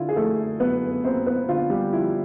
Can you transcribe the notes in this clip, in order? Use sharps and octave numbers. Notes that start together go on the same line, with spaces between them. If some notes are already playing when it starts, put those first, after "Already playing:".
Already playing: D3 E4 F4
G#4
F3 A3 A4
F#2 B3 B4
A#3 C4 C5
B3 B4
D3 F4
G3 G4
F3 E4